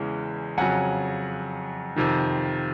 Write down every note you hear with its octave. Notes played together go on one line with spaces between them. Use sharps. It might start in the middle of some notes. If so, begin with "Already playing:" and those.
Already playing: E2 C#3 E3 G#3 C#4
F2 C#3 F#3 F#5 G#5
F2 C3 D#3